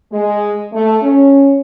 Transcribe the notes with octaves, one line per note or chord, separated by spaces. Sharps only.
G#3
A3
C#4